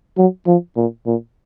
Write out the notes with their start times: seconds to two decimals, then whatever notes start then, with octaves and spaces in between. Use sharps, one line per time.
0.18 F#3
0.47 F3
0.77 A#2
1.06 A#2